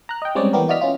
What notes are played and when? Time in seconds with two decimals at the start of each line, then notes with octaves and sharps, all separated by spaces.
0.09 A#5 F#6
0.22 D#5 G5
0.35 G3 G#3 C4 C#4 C#5 D5
0.53 E3 B3 G4 A#4 D5
0.69 E4 F#4 D5 D#5 F6 B6
0.81 C#4 F4